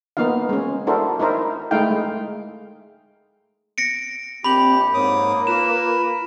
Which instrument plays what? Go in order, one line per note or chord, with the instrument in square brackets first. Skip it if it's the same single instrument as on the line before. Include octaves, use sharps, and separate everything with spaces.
[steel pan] A#3 B3 D#4 F4 F5
G#3 C#4
D4 E4 F#4 A4 A#4 C5
D#4 E4 A#4 C5
G#3 A3 D#4 E4 F5 G5
G#3
[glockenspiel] A#6 C#7 D7
[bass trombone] A#1 [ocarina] C4 [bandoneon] G4 [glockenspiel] B5 F#7
[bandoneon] G#2 D6 D#6 [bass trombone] A#3 [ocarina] C#5
[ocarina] F4 [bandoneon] A#4 B4 [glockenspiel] E7